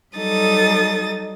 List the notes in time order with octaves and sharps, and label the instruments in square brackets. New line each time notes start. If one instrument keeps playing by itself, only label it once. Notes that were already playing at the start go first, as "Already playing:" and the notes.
[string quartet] F#3 G3 D#4 A4 D#6 A6